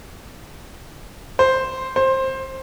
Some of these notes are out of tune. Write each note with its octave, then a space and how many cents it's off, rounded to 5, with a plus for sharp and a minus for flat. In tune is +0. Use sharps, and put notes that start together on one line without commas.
C5 +0
C5 +15